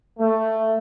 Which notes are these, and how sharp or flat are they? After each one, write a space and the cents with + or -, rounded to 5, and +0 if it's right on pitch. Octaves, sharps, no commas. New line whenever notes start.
A3 +10